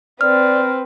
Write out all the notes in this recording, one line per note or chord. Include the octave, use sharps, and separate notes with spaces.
C4 B4 D5 F6